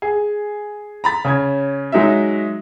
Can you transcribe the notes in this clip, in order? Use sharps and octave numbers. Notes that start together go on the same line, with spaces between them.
G#4
A#5 B5 A6
C#3 C#4 G#6
F#3 G#3 D#4 F#4 E5